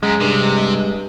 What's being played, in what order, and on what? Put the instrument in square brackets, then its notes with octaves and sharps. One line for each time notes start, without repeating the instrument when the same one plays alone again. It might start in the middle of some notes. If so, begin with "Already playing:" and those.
[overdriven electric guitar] F#2 [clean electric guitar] G#3
[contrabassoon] G2 [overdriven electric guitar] C3